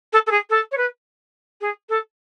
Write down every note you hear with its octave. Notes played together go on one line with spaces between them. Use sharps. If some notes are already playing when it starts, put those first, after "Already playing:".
A4
A4
G#4
A4
C#5
B4
G#4
A4